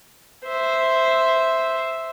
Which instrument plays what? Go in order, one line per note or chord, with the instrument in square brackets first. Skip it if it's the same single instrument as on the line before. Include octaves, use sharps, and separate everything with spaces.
[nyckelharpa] C5 E5